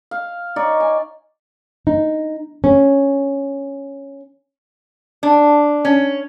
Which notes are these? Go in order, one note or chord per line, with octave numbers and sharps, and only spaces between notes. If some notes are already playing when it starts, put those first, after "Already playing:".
F5
D#4 C#5 D5
G#5
D#4
C#4
D4
C#4